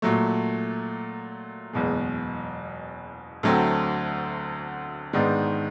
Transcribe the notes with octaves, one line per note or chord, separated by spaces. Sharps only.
A#2 F#3 A3
F#1 E2 B2 G#3
D2 D3 F#3 A3 C4
G#2 D#3 G#3 B3 D4